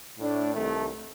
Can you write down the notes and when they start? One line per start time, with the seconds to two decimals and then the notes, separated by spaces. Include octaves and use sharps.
0.18 A2 A3 D4
0.54 C2 C3 D#3 A3